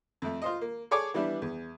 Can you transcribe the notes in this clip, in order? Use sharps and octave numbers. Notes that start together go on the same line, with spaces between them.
F2 A3
F4 C5 D#5
A#3
G#4 A4 C#5 D5 G#5 D6
E3 G3 B3 D4 E4
E2